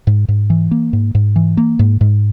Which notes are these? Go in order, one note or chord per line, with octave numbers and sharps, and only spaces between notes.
G#2
G#2
E3
A#3
G#2
G#2
E3
A#3
G#2
G#2